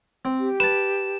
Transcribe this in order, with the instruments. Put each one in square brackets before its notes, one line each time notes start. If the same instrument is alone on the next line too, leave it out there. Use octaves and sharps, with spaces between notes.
[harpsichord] C4
[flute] G4
[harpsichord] B4 A5 [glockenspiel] E7